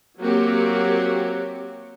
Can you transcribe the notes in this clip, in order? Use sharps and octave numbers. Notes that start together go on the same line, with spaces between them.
F#3 A#3 C4 F#4 G4